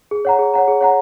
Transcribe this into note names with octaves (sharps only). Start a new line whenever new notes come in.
G#4
C#5 F#5 A#5
G#4
C#5 F#5 A#5
G#4
C#5 F#5 A#5